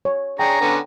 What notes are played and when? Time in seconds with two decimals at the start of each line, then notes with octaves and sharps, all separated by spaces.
0.05 C#5
0.39 D4 G#4 C#5 G5 A#5
0.61 D3 B3 C#4